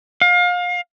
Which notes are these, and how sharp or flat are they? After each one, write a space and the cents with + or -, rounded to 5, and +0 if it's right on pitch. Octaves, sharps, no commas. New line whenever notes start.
F5 +30